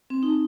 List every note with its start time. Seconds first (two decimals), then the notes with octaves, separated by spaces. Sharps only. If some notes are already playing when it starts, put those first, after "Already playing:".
0.10 C4
0.23 D#4